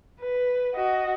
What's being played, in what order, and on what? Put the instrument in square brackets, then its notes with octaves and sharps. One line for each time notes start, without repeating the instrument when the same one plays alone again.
[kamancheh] B4
F#4 D#5